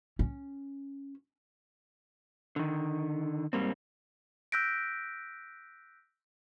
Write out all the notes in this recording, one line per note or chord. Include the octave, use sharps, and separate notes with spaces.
C#4
D3 D#3
G#2 G3 A#3 C4
E6 F#6 G6 A#6 B6 D7